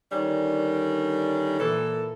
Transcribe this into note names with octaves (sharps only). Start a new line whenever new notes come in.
D3 D#3 G3 C#4 D4 A#4
A#2 E3 A4